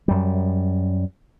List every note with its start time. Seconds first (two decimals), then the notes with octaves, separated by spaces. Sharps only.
0.08 F#2 G3